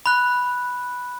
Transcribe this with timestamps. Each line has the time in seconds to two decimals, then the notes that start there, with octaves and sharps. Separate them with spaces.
0.06 B5 F#6